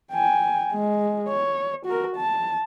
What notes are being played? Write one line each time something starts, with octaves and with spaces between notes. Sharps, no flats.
G5 G#5
G#3
C#5
F#4 A#4
A5